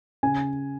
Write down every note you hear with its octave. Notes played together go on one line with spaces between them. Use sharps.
C#3 G#5